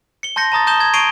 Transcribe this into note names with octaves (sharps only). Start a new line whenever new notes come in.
C#7 G7
A5 C6 G6 A#6 C#7
A5 A#5 D#6 A6
A5 D#6 G6 E7 G7
G#6
C#6 C7 D7 D#7 F7 G7